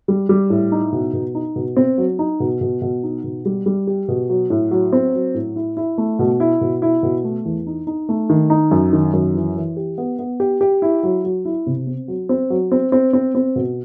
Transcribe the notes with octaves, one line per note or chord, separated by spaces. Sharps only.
G3
G3
A2
D#4
B2
B2
D#4
B2
C4
F#3
D#4
B2
B2
B2
D#4
B2
G3
G3
G4
B2
F#3
A2
F#3
C4
F#3
A2
E4
E4
A3
B2
E4
B2
E4
B2
A3
E2
D#4
D#4
A3
D#3
D#4
F#2
D#3
F#2
E3
E3
G4
B3
B3
G4
G4
E4
F#3
F#3
E4
C3
C4
F#3
C4
F#3
C4
C4
C4
C4
B2